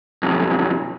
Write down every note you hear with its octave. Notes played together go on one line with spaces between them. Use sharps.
B1 F2